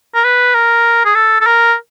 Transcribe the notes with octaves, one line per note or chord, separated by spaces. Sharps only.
A#4
B4
A#4
G#4
A4
A4
A#4